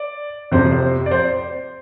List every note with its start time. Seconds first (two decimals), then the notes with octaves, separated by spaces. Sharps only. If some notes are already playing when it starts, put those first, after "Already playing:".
Already playing: D5
0.52 F2 C3 C5
0.72 C5
1.06 D5
1.11 C5